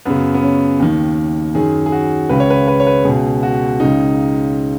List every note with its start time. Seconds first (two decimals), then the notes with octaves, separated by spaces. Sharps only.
0.05 F#2 C#3 B3
0.34 B3
0.42 C#4
0.80 D#2 D#3
1.55 F#2 D#3 G#4
1.86 G#4
1.92 F#4
2.29 C#2 C#3 B4
2.40 C#5
2.50 B4
2.67 B4
2.80 C#5
2.87 B4
3.04 C#2 B2 G#4
3.43 F#4
3.80 C#2 C#3 D#4